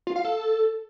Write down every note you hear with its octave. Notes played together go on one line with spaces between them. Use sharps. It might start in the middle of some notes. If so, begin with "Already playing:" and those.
F4
F5
A4